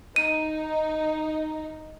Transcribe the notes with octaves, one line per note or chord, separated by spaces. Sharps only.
D#4 D#7